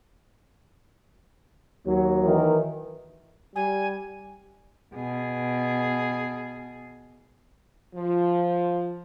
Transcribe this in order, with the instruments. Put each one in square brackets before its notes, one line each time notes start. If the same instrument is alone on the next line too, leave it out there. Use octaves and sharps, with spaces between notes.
[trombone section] D#2 F#3
[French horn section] D#3 E3
[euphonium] G3 [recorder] G#5
[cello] B2 G#4
[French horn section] F3